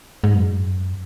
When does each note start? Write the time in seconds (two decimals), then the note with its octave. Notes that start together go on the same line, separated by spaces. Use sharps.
0.24 G#2
0.35 F#2